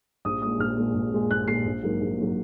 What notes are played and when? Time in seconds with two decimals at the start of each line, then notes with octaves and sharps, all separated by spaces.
0.25 A#1 D#6
0.42 A#2 G#3 D#6
0.59 A#1 F6
0.77 A#2 G#3
0.94 A#1
1.12 A#2 G#3
1.31 A#1 F#6
1.48 A#2 G#3 C7
1.65 A#1
1.83 G#2 F#3 A#3
2.01 A#1
2.18 G#2 F#3 A#3